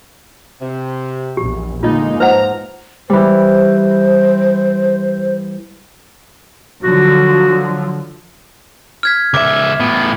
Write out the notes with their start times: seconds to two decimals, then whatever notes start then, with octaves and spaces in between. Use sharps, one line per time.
0.61 C3
1.37 A#1 E2 G4
1.83 D3 G#3 A#3 D#4 F4 D#5
2.20 G#2 F3 B4 C5 F#5 A#5
3.10 E3 G3 C5
6.83 D3 F3 F#3 F#4
9.03 F6 G#6 B6
9.34 C#2 E5 D6
9.80 A2 B3